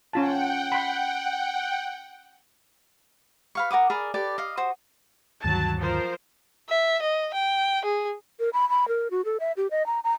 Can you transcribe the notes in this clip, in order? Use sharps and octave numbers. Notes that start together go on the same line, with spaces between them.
C#4 F4 F#5 G5 A5
B5 C6
B4 F5 C#6
A#4 F#5 D6 D#6
G#4 A#4 D5 B5
G4 A4 B4 D5
D#5 F5
F#4 C5 D#6
D2 G2 D#3 F#3 A5
F3 A#4 C5
E5
D#5
G5
G#4
A#4
B5
B5
A#4
F#4
A4
E5
G4
D#5
A#5
A#5